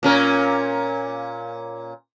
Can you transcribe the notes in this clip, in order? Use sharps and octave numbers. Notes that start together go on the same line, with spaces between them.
A#2 C#4 A#4